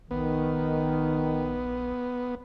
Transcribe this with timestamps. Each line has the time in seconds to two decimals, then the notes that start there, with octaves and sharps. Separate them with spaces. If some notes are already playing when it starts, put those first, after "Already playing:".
0.11 A#1 D#3 B3